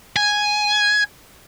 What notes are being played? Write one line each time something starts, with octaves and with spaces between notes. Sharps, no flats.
G#5